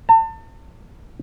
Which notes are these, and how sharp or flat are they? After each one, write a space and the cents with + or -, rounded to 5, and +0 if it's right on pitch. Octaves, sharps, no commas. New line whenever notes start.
A5 +35